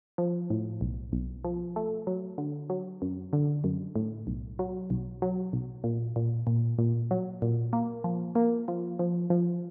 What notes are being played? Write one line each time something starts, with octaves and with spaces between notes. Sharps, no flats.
F3
A2
B1
B1
F3
A3
F#3
D3
F#3
F#2
D3
F#2
A2
B1
F#3
B1
F#3
B1
A#2
A#2
A#2
A#2
F#3
A#2
A#3
F3
A#3
F3
F3
F3